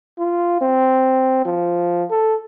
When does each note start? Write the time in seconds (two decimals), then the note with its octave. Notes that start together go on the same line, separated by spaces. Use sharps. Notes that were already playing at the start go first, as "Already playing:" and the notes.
0.18 F4
0.61 C4
1.45 F3
2.11 A4